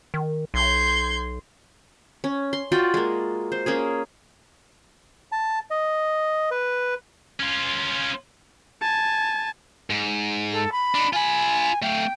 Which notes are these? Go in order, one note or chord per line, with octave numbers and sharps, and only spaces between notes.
D#3
B1 C6 G6 G#6
C#4
C6
F4 F#4 D5 G5
G#3 A#3
C5
A#3 C#4 G#4
A5
D#5
B4
C#4 F4
G#5 A5
G#2
A4
B5
D4 D#4
F4 G#5 B5
A3 F5 G5